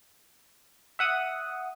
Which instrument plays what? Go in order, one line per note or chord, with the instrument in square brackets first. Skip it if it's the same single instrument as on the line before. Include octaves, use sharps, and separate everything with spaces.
[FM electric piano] E5 F#5 D#6